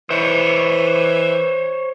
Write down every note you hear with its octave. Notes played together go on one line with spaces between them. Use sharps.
E3 C5 C#5